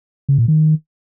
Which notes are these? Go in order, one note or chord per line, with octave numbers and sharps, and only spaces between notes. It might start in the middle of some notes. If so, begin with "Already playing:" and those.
C#3
A#2
D#3